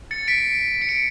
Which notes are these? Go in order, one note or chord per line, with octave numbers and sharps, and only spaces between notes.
A6 C#7
B6 D7
C#7
D7